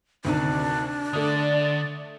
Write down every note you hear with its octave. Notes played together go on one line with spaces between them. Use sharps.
D2 C3 D#3 D4
D3 A3 D5 D#6